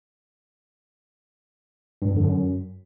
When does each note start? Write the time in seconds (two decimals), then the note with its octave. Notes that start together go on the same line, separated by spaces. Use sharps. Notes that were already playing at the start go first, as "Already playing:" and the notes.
2.02 G2
2.09 F2
2.17 D3
2.24 F#2